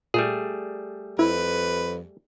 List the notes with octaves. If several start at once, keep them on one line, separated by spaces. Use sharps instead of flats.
A#2 G3 A3 G#4
F2 E4 B4